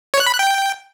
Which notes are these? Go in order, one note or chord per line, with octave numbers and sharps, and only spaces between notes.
C#5
F#6
B5
F#6
G5